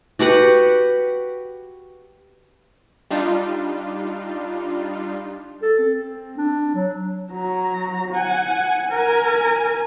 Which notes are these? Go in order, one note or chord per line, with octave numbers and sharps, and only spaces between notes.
F#4 G4 B4 F#5
G3 D4 D#4 F4
A4
C4
D4
F#3
F#3 A#5
F#5 G#5
A#4 G#5